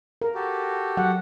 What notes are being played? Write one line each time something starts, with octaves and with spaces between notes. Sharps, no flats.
A#4
F#4 G4 A4
F#3 F#5